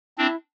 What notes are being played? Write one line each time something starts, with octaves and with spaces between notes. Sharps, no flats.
C4 D4 E4